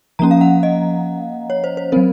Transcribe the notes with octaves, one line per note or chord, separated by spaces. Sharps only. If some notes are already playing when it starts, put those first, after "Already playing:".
F3 A#3 C#4 A#5
F5
F#5
D#5
C#5
C5
C5
F#3 C4 A#4